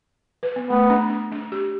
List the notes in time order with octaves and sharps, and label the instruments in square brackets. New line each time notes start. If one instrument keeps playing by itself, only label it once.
[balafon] B4
B3
[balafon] A3 [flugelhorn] B3
[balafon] D4
D4
D4
G4